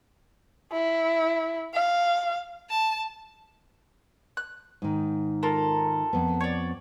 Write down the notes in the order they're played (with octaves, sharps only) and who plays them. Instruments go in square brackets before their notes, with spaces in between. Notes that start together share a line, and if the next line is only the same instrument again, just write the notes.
[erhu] E4
F5
[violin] A5
[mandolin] F#6
[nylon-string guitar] G#2 D#3
[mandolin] F4 A4 A#4
[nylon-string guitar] F2 B3
[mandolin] C#5 D5